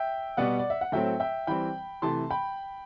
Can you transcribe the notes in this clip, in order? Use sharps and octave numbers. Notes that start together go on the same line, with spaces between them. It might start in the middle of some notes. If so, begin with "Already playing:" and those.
Already playing: E5 G5
B2 G3 B3 D5 F#5
D5
E5
F#5
A2 F#3 A3 C4 E5 G5
E5 G5
E3 G3 C4 G5 B5
C3 E3 A3 A5 C6
G5 B5